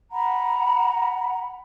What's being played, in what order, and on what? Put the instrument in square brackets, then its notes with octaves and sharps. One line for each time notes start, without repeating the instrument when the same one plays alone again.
[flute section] F#5 A#5 B5